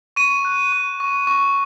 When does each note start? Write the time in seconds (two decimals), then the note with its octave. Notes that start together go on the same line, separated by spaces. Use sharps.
0.16 C#6 D#7
0.45 F#6
0.72 C#6
1.00 C#6
1.27 C#6